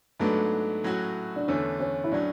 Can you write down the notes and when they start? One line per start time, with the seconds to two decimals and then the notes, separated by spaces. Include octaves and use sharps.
0.20 G#2 F#3 A3 B3 D4
0.84 A2 F#3 C#4 F#4
1.36 D4
1.48 E2 D3 A3 C#4
1.80 C#4
2.04 E4
2.12 A2 F#3 C#4 D4